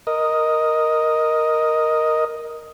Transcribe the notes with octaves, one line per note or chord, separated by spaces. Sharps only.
A#4 D#5